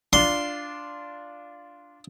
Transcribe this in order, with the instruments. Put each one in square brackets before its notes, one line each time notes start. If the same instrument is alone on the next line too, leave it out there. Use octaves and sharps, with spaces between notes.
[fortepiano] D4 F4 [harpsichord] C6